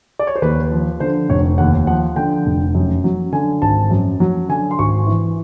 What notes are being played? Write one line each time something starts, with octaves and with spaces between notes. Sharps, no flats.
D5
C#5
C5
D#2 B4
F3
D3 C5
F1 C#5
D#2 F#5
F3 F#5
D3 G5
F1
F#2
F#3
D3 G#5
G#1 A5
F#2
F#3
D3 G#5
C6
G#1 C#6
E3